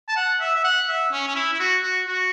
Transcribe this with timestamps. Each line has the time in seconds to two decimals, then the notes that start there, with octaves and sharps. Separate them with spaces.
0.08 A5
0.17 F#5
0.40 E5
0.55 E5
0.64 F#5
0.88 E5
1.12 C#4
1.27 C#4
1.35 E4
1.53 E4
1.59 F#4
1.83 F#4
2.07 F#4